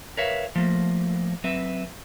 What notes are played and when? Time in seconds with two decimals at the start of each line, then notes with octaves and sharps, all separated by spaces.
0.17 A#4 B4 C#5 E5 F5
0.56 F3 A3 A#3
1.44 F#3 C4 B4 E5